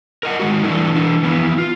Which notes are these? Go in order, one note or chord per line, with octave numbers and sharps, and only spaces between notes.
A#4 D#5 F#5
D#3 G#3 F#4
E3 G3 A3 D4 E4 A4
E3 D4
E3 F3 B3 E4
F4